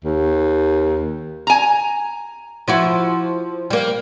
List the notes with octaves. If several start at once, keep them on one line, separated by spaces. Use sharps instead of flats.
D#2
G#5 A#5
F3 E4 F#4
G3 A#3